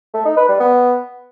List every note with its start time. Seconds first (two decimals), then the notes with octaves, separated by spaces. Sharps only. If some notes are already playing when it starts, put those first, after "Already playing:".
0.13 A3
0.25 D#4
0.37 B4
0.48 G3
0.60 B3